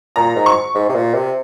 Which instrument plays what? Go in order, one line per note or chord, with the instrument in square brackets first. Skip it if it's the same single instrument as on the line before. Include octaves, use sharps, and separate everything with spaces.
[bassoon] A#2 [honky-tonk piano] A#5
[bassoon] G#2
[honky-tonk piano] C#6
[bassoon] G#2
C3
A#2
C3